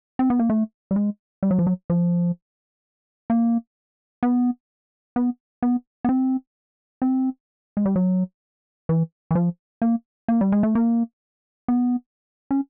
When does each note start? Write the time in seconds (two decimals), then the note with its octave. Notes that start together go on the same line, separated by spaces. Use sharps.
0.19 C4
0.30 B3
0.39 A#3
0.50 A3
0.91 G3
0.96 G#3
1.43 G3
1.51 F#3
1.59 F3
1.67 F#3
1.90 F3
3.30 A#3
4.23 B3
5.16 B3
5.63 B3
6.05 B3
6.09 C4
7.02 C4
7.77 G#3
7.86 G3
7.96 F#3
8.89 E3
9.31 E3
9.35 F3
9.82 A#3
10.28 A#3
10.41 G3
10.52 G#3
10.63 A3
10.75 A#3
11.68 B3
12.51 C#4